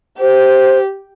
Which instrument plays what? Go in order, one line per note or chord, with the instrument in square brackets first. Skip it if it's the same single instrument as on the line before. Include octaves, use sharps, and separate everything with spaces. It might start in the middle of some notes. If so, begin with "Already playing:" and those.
[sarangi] G4 [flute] C5